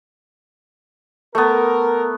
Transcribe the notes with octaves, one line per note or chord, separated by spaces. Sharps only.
A3 B3 A#4